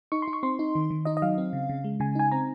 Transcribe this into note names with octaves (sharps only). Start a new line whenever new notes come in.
D#4 C#6
C6
D#4
C#6
C4 C6
D#4
D#3
D#3
D#4 D#5
D#5
F#3 F5
C4
C#3
C#3
G#3
C#3 G#5
D#4 G#5
C4 A#5